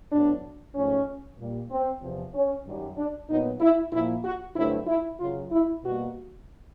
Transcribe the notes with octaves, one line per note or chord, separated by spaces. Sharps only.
A2 F#3 B3 D4
G#2 F3 A3 C#4
A#2 G3 A#3
C4
E2 C3 F3
C#4
F#2 D#3 G3
D4
A#2 F#3 B3 D#4
E4
A#2 F3 A#3 E4
F#4
G2 D3 F#3 A3 C4 E4
E4
F#2 C#3 F#3 F4
E4
B2 G3 A#3 F#4